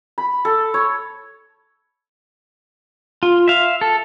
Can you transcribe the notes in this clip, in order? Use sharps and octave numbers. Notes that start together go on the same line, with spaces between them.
B5
A4
C#5
F4
E5 F5
A4